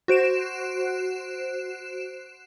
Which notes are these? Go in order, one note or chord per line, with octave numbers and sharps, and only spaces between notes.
F#4 C5 D7 E7